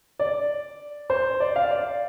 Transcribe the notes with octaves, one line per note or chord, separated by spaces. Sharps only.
D5
C5
D5
F5
D5